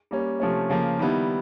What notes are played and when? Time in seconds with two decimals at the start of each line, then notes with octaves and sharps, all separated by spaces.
0.11 G3 A#3 C#4
0.40 C3 F3 A3 C#4
0.70 C#3 F3 A#3
0.99 D#3 G3 B3 E4